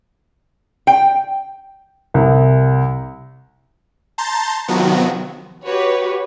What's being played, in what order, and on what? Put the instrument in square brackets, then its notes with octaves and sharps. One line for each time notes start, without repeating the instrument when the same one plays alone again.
[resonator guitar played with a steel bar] G5
[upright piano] C2
[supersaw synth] A5 A#5 C6 G6 A6
C3 D#3 F3 F#3 B3 F#4
[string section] F#4 G4 B4 C#5